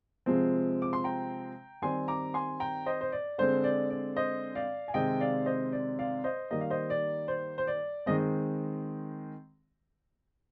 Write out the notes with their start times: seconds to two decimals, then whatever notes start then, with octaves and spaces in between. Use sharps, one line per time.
0.26 C3 F3 G#3 C4
0.82 D6
0.93 C6
1.04 G5 A#5
1.82 D#3 G3 C4 G#5 C6
2.08 A#5 D6
2.34 G#5 C6
2.60 G5 A#5
2.86 C5 D#5
3.01 C5
3.12 D5
3.38 D3 G#3 C4 C5
3.64 D5
3.90 D5
4.16 C5 D#5
4.55 D5 F5
4.88 G#5
4.94 C3 D#3 G#3 C4 D#5 G5
5.20 D5 F5
5.46 C5 D#5
5.72 D5
5.99 D5 F5
6.24 C5 D#5
6.51 D#3 G3 A#3 D#5
6.61 F5
6.70 C5 D#5
6.90 D5
7.28 C5
7.58 C5
7.67 D5
8.06 D#3 G#3 C4 D#5